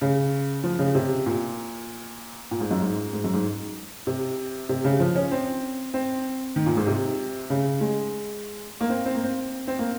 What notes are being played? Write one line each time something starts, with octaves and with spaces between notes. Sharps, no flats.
C#3
F3
C#3
C3
A#2
A#2
G#2
F#2
G#2
G#2
F#2
G#2
C3
C3
C#3
F3
C#4
C4
C4
D#3
A#2
G#2
C3
C#3
G#3
A#3
C4
C4
A#3
C4
C4
A#3